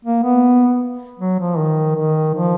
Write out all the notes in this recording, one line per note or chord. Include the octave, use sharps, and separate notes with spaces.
A#3
B3
F#3
F3
D#3
D#3
F3